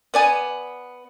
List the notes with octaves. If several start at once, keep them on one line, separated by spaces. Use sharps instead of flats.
B3 D5 G#5